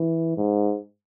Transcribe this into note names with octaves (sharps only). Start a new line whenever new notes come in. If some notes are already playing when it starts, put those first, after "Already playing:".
Already playing: E3
G#2